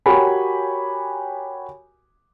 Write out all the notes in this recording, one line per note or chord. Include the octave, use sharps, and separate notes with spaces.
F#4 G4 A#4 C#5 G#5 B5